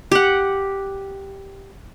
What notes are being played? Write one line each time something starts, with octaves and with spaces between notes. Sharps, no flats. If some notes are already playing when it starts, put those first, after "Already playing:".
G4 F#5